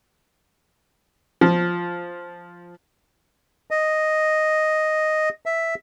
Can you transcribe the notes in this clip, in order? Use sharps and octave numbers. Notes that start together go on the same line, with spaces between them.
F3
D#5
E5